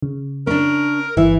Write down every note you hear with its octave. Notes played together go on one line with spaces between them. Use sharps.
C#3
C#4 D4 A#4
G1 E3 E4 E5